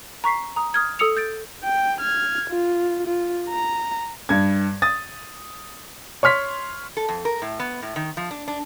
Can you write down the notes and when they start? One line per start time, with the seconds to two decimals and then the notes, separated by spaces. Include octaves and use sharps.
0.24 A#5 C#6 B6 C7
0.56 A#5 D#6
0.74 D#6 F6 G#6
0.99 A4 D#6 E6 C#7 F7
1.17 G6 A6 D7
1.64 G5
2.00 F6 G#6
2.50 F4
3.07 F4
3.49 A#5
4.29 G2 G#6
4.82 D#6 A6
6.23 C#5 C6 F6 B6
6.97 A4
7.09 F2
7.25 A#4
7.42 A2
7.60 B3
7.82 A2
7.96 D#3
8.17 F3
8.31 D4
8.48 D4